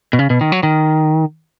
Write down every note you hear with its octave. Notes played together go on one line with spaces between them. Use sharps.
B2
C#3
B2
D#3
F#3
D#3